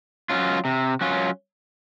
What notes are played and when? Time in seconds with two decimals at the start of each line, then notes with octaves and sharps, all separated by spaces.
0.29 F#3 C#4 F4
0.65 C3
1.01 F#3 C#4 F4